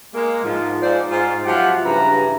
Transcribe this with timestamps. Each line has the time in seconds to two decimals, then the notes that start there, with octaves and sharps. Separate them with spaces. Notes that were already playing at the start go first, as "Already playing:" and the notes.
0.14 G#3 A#3
0.44 G#2 F3
0.81 G#2 F4 C5 D5
1.11 G#2 F4
1.45 F3 F#3 C4 G4 E5 F#5
1.85 G2 C#3 E3 B4 A#5